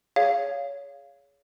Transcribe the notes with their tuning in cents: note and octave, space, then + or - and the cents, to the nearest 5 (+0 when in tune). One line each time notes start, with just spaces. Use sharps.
G#4 +0 C#5 +25 F5 -5